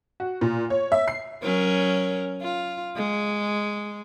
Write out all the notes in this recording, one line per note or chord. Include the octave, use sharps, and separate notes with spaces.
F#4
A#2
C#5
E5
C7
F#3 C#4 A#4
F4
G#3